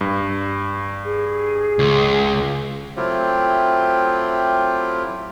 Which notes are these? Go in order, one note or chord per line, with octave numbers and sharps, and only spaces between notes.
G2
G#4
C#2
F#3 A3 C4 E4 F4 G4